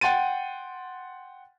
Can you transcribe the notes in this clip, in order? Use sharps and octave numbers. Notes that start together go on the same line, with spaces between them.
F#5 G5 C6 A6 D#7